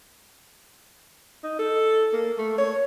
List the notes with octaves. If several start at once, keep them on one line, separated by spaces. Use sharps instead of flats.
D#4
A4
A#3
A3
C#5